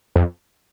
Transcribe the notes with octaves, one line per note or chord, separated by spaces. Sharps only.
F2